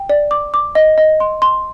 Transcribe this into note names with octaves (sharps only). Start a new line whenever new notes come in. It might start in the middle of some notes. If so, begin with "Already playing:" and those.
Already playing: G5
D5
D6
D6
D#5
D#5
C6
C6